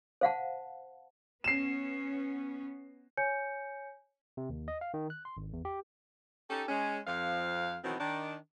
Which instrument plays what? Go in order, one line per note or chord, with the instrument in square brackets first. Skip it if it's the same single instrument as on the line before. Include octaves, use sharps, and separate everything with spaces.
[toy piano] C5 F5 F#5 A5
[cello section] B3 C#4 [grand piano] C7 E7
[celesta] C#5 G#5 G6 C#7
[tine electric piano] C3
D#2
D#5
F5
D#3
F#6
C6
G#1
E2
G4
[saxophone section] C#4 D#4 G4 A4
G#3 C#4
F2 F3 F5
B2 D#3 E3 F#3 B3 C4
D#3 D4